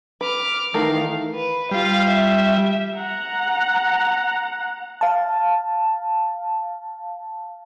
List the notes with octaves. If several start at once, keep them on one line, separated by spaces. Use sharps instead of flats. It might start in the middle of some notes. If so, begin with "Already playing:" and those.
B4 D6 F6
D#3 E3 A3 D#4 A#4 F5
B4
G3 F4 F5
E5
F#5 A#5
F5 A5